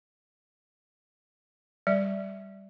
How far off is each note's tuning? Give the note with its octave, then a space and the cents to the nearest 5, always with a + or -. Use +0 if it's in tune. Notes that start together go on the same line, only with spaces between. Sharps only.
G3 +0 D5 +0